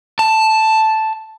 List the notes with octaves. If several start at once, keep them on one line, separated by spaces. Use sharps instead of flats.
A5